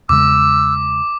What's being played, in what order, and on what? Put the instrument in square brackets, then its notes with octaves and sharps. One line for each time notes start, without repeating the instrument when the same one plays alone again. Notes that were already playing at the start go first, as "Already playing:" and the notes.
[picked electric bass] E2 C#3 G#3 [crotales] D6 [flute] E6